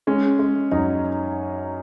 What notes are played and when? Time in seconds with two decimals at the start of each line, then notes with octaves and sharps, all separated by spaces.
0.07 G#3 C#4
0.39 G#3
0.72 F#2 D#4